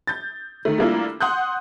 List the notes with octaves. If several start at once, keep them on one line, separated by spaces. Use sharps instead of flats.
G6 A6
D#3 A3
G3 A3 A#3 D4 E4 F4
F#5 C6 D#6 F#6 G6